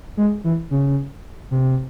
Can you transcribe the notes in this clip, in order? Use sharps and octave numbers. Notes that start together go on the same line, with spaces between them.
G#3
E3
C#3
C3